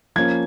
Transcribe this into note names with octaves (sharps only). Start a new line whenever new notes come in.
F3 A#3 C#4 G#6